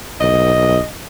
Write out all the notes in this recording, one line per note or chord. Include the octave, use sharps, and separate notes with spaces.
B1 D#5